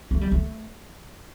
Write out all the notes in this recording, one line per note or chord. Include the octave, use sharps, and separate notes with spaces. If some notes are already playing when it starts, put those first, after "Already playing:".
A3
G3
A3